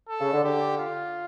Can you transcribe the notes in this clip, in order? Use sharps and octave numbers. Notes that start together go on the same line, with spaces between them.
A4
C#3
D3
D3 G4
F4